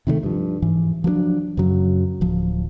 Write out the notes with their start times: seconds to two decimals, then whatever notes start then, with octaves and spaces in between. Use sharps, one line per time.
0.07 C3 D#3 F3 A3
0.23 G2 F3
0.62 G#2 E3
1.04 F3 F#3 A#3 D4
1.57 F#2 C#3 F#3
2.21 D1 F3